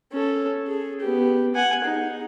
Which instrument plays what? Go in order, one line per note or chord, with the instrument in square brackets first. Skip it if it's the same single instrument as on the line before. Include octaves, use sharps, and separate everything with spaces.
[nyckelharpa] C#4 A4
G#4
B3 G4
F#5 G#5
D#4 G#4